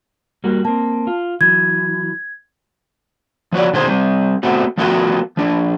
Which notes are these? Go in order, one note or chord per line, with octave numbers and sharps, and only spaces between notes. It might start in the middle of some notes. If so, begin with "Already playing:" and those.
G3 A#3 F#4
A#3 C4 A5
F4
E3 F#3 G#6
F3 F#4 C#5 D5
B2 D3 D#3 G#3 G#4 C5
G3 C4
A3 B3 C4 F#4
F3 A3 B3 F4 F#4 A#4
F3 D4